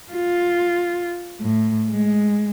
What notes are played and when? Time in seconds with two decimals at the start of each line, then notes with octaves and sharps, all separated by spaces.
0.12 F4
1.41 A2
1.90 G#3